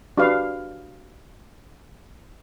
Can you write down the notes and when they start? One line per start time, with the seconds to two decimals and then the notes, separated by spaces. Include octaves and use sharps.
0.17 D4 F#4 G4 B4 F5